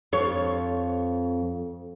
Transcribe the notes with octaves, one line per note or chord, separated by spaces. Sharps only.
F2 C#5